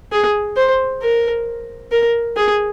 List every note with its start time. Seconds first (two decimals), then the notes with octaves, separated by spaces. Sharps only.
0.12 G#4
0.57 C5
1.02 A#4
1.92 A#4
2.37 G#4